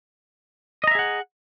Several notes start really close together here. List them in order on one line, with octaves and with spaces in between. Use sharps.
D#5 A#5 E5 G#4 F#5